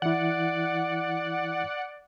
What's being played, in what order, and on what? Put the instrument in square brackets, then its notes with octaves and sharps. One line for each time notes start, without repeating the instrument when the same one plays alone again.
[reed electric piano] E3 E4 [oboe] D5 [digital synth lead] F#5